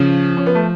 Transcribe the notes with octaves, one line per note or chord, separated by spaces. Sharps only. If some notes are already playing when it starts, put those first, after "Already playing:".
Already playing: C#3 F3 C#4
C#4
B3
A3